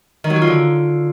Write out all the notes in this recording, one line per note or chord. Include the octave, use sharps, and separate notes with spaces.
D#3
F#3
F#4
F4
D3